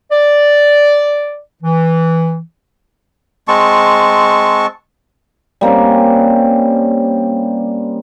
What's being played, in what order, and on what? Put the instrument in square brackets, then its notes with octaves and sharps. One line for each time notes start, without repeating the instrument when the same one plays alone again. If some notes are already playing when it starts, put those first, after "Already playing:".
[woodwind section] D5
E3
[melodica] G#3 C4 A5 C#6
[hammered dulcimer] G3 A#3 C4 C#4